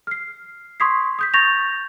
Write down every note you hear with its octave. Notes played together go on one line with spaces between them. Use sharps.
F6 C7
C6 C#6 D#6 G#6 B6 C7
D#6 G6 B6
C#6 G6 A6 A#6 F7